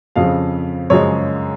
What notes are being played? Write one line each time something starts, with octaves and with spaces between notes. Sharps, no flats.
F2 C#3 F3 F5
F#2 C#3 F3 G#3 C#5